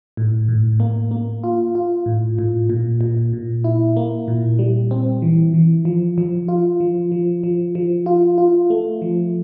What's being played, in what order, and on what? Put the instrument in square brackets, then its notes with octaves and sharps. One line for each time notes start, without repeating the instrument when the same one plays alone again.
[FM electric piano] A2
A2
A#3
A#3
F4
F4
A2
A2
A#2
A#2
A#2
E4
A#3
A#2
G3
C4
E3
E3
F3
F3
F4
F3
F3
F3
F3
F4
F4
A3
F3